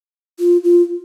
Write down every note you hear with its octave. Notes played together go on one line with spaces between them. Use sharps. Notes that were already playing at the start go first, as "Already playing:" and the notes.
F4
F4